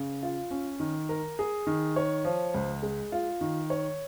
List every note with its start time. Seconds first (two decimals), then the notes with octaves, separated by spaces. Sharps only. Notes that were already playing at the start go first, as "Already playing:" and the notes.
Already playing: C#3
0.23 F4
0.51 C#4
0.80 D#3
1.09 A#4
1.39 G#4
1.67 D#3
1.96 C#5
2.25 F3
2.54 C#2
2.83 G#3
3.12 F4
3.41 D#3
3.70 C#5